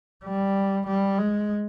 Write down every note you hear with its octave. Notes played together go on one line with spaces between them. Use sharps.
G3
G3
G#3